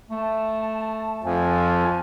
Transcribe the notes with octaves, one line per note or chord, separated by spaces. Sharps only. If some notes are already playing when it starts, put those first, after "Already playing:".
A3 A5
F2 F3 G#5